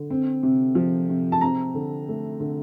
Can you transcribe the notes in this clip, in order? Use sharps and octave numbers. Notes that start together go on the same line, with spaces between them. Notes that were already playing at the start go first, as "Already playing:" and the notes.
Already playing: D3
C4
C3
F3
C3
A5
C4 A#5
D3
A3
D3